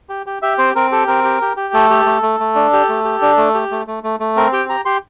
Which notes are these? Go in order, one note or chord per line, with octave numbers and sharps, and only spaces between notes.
G4
G4
G4 E5
C4 C5
C4 A#4
G4 A4
C4 A#4
G4
G4
G4
A3 A4
G4
A3
A3
A3
D4
G4
A3
G4
D4
A3
G4
A3
A3
A3
A3
C4 A#4
G4 G5
G4 A#5
G4 C6